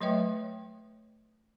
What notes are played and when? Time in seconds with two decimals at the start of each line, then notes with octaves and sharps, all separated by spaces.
0.01 F#3 A3 B4 C#5 E5 G5